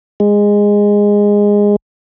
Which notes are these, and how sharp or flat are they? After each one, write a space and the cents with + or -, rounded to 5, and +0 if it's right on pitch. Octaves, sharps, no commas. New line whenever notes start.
G#3 -15